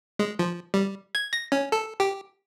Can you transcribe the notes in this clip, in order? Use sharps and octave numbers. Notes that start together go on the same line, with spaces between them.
G#3
F3
G3
G#6
A#6
C#4
A4
G4